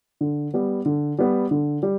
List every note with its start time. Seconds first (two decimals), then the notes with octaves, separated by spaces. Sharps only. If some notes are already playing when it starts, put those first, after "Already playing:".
0.21 D3
0.54 G3 B3
0.86 D3
1.19 G3 B3
1.51 D3
1.83 G3